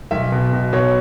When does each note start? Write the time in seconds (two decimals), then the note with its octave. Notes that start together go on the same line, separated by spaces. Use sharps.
0.11 B1 E5
0.32 B2
0.53 B2
0.73 B2 C#5